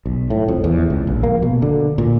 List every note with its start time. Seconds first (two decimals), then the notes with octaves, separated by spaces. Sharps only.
0.06 B1
0.30 A2
0.48 F2
0.64 E2
0.90 C#2
1.07 A#1
1.23 A#3
1.42 B2
1.62 D3
1.98 A#2